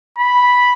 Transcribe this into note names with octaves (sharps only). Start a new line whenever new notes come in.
B5